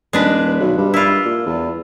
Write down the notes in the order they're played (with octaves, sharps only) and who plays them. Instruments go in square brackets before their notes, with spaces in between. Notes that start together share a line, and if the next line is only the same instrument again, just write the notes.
[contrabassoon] D#1 [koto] G#3 D4 B4
[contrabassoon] B1
G2
[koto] E4 F4
[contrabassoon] A#2
E2